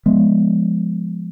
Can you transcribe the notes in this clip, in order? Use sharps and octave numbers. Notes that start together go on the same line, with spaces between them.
F3 G#3 B3